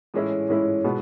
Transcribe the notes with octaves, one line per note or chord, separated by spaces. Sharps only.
A2 E3 G#3 C#4 E4
A2 E3 G#3 C#4 E4
B2 G#3 B3